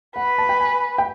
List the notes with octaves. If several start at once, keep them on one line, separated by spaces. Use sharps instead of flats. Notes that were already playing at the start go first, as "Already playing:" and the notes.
B4 F#5
A5
G5
G#5
G5